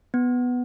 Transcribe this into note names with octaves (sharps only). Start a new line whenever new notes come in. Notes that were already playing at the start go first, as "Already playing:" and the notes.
B3